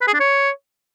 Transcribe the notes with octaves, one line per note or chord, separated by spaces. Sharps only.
B4
G#4
D4
C#5